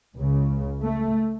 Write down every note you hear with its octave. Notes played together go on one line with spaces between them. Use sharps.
C#2 C#3
A3